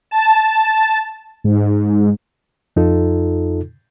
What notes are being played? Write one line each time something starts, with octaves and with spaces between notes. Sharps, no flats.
A5
G#2
F2 D#4 F4 A4